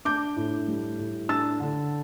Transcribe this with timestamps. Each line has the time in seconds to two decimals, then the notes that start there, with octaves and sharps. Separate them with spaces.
0.05 D4 D6 G6
0.36 A2
0.68 G3
0.99 A2
1.29 D4 E6 A6
1.60 D3